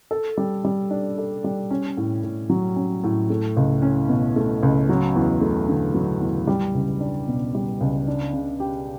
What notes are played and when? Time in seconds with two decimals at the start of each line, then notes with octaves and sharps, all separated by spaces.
0.11 A4
0.37 G3
0.65 G3
0.90 D4
1.18 A4
1.44 G3
1.71 C#4
1.97 A2
2.23 A2
2.49 F#3
2.76 C#4
3.04 A2
3.30 A3
3.57 C#2
3.82 C#4
4.09 B2
4.36 A3
4.63 C#2
4.89 F#3
5.16 E2
5.41 A3
5.69 D3
5.95 F#3
6.21 E2
6.47 G3
6.74 C#2
7.00 D4
7.28 B2
7.55 G3
7.81 C#2
8.08 D4
8.33 C#3
8.60 G4